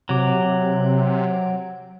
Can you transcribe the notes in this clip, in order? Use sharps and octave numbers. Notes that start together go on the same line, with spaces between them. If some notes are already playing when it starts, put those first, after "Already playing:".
C3 F#3 D6